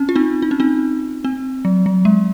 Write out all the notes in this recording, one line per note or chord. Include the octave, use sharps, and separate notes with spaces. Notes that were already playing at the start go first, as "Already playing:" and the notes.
Already playing: C4 C#4
F4
C4 D#4
D#4
C#4
C4 D#4
C4
F#3
F#3
G#3